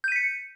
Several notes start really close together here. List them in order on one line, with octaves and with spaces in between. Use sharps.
G6 D#7 B6 C#7